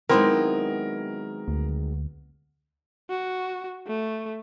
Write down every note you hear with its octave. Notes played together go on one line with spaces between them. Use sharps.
D#3 F#3 G#3 B3 C4 E4 A#4
D2
F#4
A3